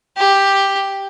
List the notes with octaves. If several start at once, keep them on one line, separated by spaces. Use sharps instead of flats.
G4